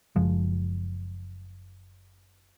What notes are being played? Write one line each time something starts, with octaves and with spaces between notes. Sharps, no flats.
F#1 F#2 F3 G#3